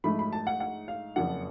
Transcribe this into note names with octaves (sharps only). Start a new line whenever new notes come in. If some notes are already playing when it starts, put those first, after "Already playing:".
G#2 F3 A3 B5
B5
A5
F#5
F#5
F5
F#1 F2 F3 F#5